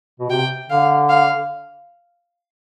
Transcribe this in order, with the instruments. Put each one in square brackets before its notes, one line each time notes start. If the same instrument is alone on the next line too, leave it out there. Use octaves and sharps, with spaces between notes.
[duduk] B2
[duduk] C3 [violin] G5
[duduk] D3 [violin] F5
[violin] F5